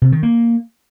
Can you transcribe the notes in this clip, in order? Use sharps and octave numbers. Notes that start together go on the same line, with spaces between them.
C3
D#3
A#3